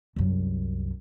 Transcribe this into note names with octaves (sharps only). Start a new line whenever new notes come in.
C2 F#2